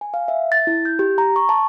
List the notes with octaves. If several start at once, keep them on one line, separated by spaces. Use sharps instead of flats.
G#5
F5
E5
A6
E4
G6
G4
A#5
C#6
A5